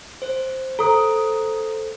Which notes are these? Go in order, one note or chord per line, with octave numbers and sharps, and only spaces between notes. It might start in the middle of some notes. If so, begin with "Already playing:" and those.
C5
A4 C5 A#5 D#6